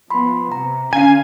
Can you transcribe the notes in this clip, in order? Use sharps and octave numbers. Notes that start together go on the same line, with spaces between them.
F3 B3 B5 C6
C3 A#5
D3 C#4 F5 G#5